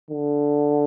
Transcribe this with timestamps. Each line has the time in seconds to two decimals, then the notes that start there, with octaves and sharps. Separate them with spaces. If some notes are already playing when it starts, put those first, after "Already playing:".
0.11 D3